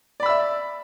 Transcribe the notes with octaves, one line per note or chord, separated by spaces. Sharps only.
D5 E5 B5 E6